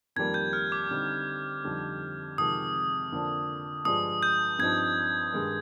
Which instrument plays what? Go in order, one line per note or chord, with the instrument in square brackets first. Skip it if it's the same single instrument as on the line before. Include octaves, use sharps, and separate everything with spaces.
[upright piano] F2 D#3 G3 A#3 [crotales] G#6
[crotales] G6
F6
D6
[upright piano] D3 G3 C4 D#4
F2 D3 G3 C4 D#4
[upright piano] F2 C3 D#3 G#3 [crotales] D#6
[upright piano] F2 D3 F3 A#3 D4
[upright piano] G2 F3 G#3 D4 [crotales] D#6
[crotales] G6
[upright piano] G2 F3 C4 D#4 [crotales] G#6
[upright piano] G2 D#3 G#3 D#4